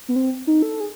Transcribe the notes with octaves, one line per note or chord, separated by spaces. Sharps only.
B3
C4
D#4
A4
G#4